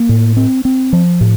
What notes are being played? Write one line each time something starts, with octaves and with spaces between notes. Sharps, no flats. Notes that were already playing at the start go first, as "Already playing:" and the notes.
Already playing: A#3
A2
C4
C4
F3
A2